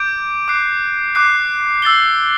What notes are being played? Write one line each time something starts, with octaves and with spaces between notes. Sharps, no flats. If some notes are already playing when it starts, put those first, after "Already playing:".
Already playing: D6 G6 D7
D6 F#6 C7
D6 F#6 C7
E6 A6 C7 G7